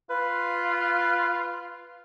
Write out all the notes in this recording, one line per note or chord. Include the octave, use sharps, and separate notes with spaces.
F4 B4